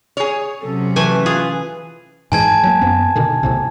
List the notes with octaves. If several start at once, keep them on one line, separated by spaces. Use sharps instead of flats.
G#4 C#5
C3 F#3 C#4 A4
E3 A3 B4 G#5
F4 G#4
G#2 E3 G#3 G#5 A5 G#6
F#3 A#3
F#2 B3 C4
B2 D3 D#3
B1 A2 C3